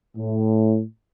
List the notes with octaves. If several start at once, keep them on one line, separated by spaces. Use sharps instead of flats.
A2